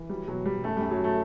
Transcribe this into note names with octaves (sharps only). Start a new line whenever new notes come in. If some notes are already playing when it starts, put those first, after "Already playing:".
Already playing: E3
F#3 G3
B2 F#3
F#3 G3
F#2 A3
G3
F#2
F#3
A3